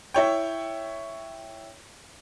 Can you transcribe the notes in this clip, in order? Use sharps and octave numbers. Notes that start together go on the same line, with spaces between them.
E4 C#5 G5